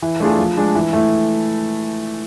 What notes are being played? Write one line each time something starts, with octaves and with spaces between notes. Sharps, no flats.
E3
A3 D4 F4 G#4
F3
G#3 D4
E3
A3 E4